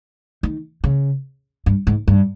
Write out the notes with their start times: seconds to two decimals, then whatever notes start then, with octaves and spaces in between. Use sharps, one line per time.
0.43 D#3
0.84 C#3
1.66 G2
1.87 G#2
2.08 G2